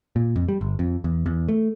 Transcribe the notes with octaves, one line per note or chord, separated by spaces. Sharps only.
A#2
F2
G3
G1
F2
E2
E2
A3